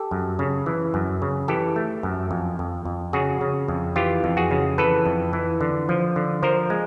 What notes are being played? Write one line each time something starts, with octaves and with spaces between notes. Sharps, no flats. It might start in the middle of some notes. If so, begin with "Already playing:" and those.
Already playing: G4 A4
F#2
C#3
E3
F#2
C#3
E3 G4 A4
A3
F#2
F2
F2
F2
C#3 F#4 G#4
C#3
F2
E3 F4 G4
F2
F#4 G#4
C#3
E3 A4 B4
F2
E3
D3
F3
D3
F3 A#4 C5
G#3